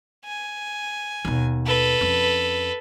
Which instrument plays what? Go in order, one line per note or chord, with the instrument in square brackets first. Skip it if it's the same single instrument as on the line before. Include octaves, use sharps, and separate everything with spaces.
[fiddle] G#5
[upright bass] D#2 B2
[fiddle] A4 B4
[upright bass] F2 C#4